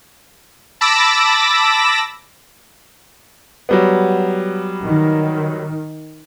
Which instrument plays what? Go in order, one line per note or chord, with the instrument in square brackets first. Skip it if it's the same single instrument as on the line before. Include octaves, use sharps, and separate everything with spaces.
[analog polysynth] A5 B5 D6 E6 A#6
[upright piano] F#3 G3 B3
[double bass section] D#3